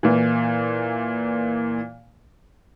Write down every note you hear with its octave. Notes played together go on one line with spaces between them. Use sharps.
A#2 E3